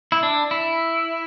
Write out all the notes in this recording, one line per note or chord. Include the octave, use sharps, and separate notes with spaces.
E4
D4
E4